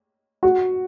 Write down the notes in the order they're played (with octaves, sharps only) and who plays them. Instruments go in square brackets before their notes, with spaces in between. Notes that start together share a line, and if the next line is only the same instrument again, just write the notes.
[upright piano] F#4